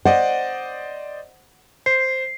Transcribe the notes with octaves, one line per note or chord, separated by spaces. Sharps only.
C5 D5 D#5 F#5
C5 C7